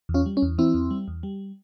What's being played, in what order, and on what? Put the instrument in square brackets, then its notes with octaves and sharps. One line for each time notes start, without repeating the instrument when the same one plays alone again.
[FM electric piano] E2
C#4 F4
G3
C#4
E2
E3 C4 E4
E2
G3
E2
G3